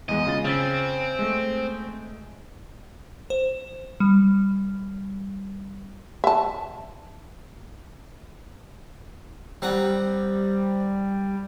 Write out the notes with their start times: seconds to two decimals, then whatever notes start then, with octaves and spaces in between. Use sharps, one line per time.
0.09 E2 G#3 D#5
0.27 C#3 F4 A6
0.45 C#3 C4 A6 B6
1.19 G#3 A3
3.30 C5
4.00 G3
6.24 E5 A5
9.62 G3 C4 F#5 A#5